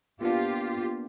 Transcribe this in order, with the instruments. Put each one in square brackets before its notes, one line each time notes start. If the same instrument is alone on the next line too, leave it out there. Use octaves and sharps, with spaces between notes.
[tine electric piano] A#3 B3 D4 [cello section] F4 G4